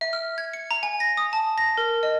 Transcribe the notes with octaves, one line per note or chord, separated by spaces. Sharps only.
E5
F6
G#6
C#7
A#5
G#5
A#6
D#6
A5
A#6
A#4
D#5